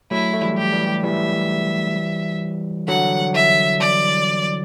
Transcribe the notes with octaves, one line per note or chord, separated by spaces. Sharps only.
F#3 A3 E4
A3
E3 G3
G4
E3 G3
E3 G3 E5
D3 F#3 F#5
E5
D5